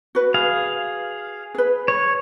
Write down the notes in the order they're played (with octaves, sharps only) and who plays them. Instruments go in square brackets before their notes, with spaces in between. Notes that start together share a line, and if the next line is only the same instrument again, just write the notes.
[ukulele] F#4 B4
[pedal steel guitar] G#4 F5
[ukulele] G#4 B4
[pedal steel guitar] C#5